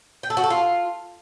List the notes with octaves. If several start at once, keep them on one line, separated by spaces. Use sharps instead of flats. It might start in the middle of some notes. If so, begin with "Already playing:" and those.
G5
A4
F#4
A4
F4